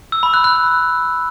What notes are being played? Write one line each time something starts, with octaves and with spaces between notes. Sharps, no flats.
E6
B5
F#6
F#6